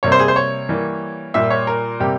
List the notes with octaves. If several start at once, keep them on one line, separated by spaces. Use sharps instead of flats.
C3 G3 A#3 C#5
C5
G#4
C5
C#5
E3 G3 A#3
A#2 G3 A#3 E5
C#5
A#4
C3 G3 A#3 G4